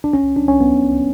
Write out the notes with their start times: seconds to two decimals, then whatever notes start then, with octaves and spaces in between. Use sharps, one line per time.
0.04 D4
0.13 C#4
0.36 D4
0.48 C#4
0.61 B3